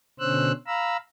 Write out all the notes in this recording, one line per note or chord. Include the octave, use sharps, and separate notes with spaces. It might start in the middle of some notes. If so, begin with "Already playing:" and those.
B2 D3 C#4 C5 E6 F#6
F5 A#5 B5 E6